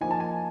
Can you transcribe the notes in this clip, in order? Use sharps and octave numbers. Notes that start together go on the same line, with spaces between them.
F3 A#3 D#4 G#5
A5
G#5